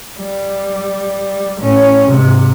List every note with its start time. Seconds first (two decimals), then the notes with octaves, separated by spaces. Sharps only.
0.19 G3
1.60 A2 C#4
2.07 G#2 C3